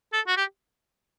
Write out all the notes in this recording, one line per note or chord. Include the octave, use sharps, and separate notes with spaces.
A4
F#4
G4